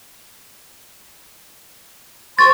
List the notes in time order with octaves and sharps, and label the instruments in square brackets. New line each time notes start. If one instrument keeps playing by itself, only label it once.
[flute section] C5 C6 C#6 [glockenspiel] A6